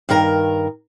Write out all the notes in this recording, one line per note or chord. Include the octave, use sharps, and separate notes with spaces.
G2 D#3 A#4 A#5